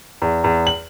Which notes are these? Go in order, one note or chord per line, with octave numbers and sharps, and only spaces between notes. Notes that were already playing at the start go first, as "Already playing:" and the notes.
E2
E2
F#7